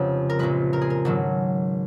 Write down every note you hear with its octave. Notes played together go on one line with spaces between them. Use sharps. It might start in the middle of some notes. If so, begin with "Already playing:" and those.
Already playing: F1 F2 C#3 F3 G#3 B4
A#4
A#1 A#2 G#3 B4
A#4
G#4
A#4
G#1 G#2 F#3